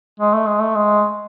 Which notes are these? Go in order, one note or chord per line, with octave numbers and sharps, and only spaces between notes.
G#3
A3
G#3
A3
G#3